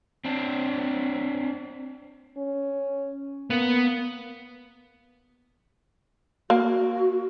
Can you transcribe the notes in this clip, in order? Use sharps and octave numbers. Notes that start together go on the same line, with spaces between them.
C4 D4
C#4
A#3 B3
A#3 F#4